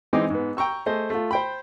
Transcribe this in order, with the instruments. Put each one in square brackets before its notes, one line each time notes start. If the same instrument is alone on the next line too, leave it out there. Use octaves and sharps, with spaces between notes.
[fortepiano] E3 G#3 C4 D#4 D#5 D6
G#2 B3
G5 A#5 C#6 E6
A3 G#4 C5 D#5
A3 F4
C5 G5 B5